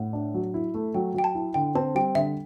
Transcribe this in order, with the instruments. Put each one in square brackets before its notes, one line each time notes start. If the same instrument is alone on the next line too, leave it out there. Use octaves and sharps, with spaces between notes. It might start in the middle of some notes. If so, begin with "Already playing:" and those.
Already playing: [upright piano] A2 [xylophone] F#5
[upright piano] D4
F#3
E4
A3
[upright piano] F#3 [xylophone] G5
[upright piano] F#3 [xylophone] G5
[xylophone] A5
[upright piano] E4
[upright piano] D3 [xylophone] G5
[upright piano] C4 [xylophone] A5
[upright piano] G3 [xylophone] G5
[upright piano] D3 [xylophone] E5